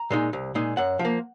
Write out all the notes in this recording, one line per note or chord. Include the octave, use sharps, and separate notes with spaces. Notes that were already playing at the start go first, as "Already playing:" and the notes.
Already playing: A#5
A#2 G#3 D#4
C2
A#2 G#3 D#4
F#2 F#5
F3
A#3